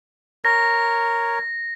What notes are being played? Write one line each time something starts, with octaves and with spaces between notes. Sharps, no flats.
A#4 C#5 A#6